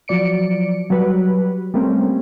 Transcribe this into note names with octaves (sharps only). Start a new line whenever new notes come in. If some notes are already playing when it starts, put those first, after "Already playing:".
F3 F#3 D5 C#7 D7
F#3 G3 B4
G3 A3 A#3 C4 C#4